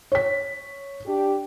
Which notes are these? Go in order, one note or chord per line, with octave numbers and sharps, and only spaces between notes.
C#5 B6
D4 G4